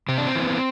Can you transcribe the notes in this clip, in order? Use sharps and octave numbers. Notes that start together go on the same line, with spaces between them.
C3 C4
D4
C4
E3 B3